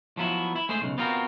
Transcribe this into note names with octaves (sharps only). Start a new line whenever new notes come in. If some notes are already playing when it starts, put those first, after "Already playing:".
F3 F#3 B3 E4
E4
G#3 A3 G#4 C5
B1 C#3
B3 C4 F4 F#4 A#4